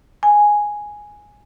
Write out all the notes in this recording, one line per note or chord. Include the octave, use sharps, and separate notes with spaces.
G#5